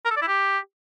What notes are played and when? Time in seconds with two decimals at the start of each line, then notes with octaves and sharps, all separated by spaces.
0.05 A#4
0.11 A4
0.16 D5
0.22 E4
0.27 G4